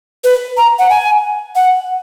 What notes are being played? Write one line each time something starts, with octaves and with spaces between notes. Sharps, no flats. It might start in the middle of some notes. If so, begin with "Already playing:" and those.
B4
A#5
F#5
G#5
F#5